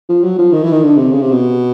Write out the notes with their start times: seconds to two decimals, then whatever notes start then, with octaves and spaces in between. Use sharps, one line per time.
0.09 F3
0.24 F#3
0.38 F3
0.53 D#3
0.62 E3
0.72 D#3
0.83 D3
0.97 C3
1.12 C#3
1.22 C3
1.32 B2